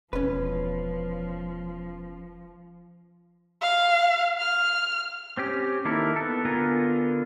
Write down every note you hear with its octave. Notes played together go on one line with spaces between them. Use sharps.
E1 F3 C#4 B4
F5
F6
C4 C#4 G4
D#3 A#3 E4 A4 A#4
B3 A4
D3 B3 F4 A#4 G#5